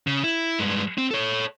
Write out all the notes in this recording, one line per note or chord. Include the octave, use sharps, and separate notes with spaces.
C#3
E4
G2 G#3
C4
A4 C#5